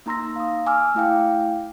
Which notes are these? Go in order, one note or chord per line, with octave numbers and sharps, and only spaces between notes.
A#3 D#4 A#5 C6 E6 A#6
F5 D#6
G#5 D6 E6 F6
A3 E4 F5 G5